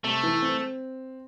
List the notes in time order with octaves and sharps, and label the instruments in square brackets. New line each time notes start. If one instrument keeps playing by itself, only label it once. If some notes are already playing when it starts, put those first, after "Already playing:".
[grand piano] C3 [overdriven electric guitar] A3
[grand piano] E3
C4